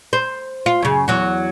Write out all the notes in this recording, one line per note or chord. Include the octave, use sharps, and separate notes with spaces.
C5
F4
F#2 C#3
E2 F#3 F#4